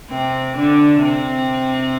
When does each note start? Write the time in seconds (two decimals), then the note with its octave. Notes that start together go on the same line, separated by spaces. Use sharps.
0.10 C3 C4
0.57 D3 D4
1.04 C3 C4